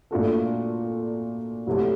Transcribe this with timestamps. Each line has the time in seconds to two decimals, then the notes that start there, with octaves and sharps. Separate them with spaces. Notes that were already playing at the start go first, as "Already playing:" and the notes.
0.11 A#2 A3 D4 F#4 A4
1.67 C2 C3 F#3 A3